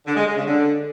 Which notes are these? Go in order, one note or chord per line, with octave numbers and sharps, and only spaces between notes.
D3
G#3
G#3
C#3
D3